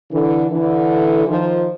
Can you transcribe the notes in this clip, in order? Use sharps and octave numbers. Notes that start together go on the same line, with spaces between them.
D3 E3
D3 E3
D#3 F3